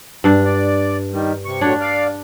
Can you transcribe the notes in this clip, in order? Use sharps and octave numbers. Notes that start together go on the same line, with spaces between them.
G2 D4
D5
D#3 G3
C3 C#6
A2 F#3 D4 C#5
D5 F5